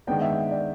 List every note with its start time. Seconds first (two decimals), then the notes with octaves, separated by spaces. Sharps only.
0.07 D#3 G#3 B3 D4 G5
0.22 E5
0.51 D5